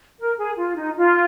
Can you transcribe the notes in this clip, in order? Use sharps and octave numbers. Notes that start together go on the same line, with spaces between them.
A#4
G#4
F4
D#4
F4